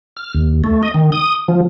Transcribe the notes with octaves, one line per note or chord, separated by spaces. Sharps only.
F6
D#2
A3
D#5
D#3
D#6
F3